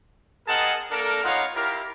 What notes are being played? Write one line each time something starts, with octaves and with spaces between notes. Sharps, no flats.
C4 G#4 A#4 D#5 F#5 A5
A#3 D4 A4 A#4
B3 D#4 F4 C#5 F5 F#5
E4 F4 G4 A#4